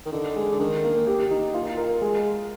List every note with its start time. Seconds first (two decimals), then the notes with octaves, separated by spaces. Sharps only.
0.06 D#3
0.12 D3 D#4
0.36 G#3
0.52 D3
0.59 D#3 D4
0.84 A#3
1.07 G4
1.31 D#4
1.54 A#2 F4
1.77 A#4
2.01 G#3